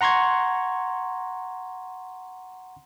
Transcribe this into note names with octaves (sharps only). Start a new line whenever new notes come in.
F#5 A#5 C6 C#6 G#6